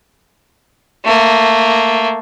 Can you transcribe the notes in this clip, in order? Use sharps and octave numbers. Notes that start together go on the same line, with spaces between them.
A3 A#3